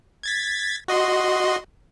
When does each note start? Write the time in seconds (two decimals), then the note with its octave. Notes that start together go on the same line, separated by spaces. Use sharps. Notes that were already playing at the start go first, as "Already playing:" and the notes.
0.23 G#6 A6 B6
0.88 F#4 D#5 C6